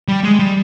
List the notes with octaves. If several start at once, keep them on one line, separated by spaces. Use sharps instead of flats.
G3
G#3
G3